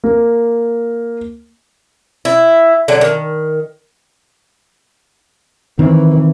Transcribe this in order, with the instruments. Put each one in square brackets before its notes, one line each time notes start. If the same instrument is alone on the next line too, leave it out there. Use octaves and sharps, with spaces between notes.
[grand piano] A#3
[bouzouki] E4
D3 F#3 D4
D#3
[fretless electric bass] D#3 C4 [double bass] E3